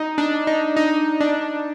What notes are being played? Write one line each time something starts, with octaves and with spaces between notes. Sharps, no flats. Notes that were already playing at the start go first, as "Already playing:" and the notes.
Already playing: D#4
D4
D#4
D#4
D4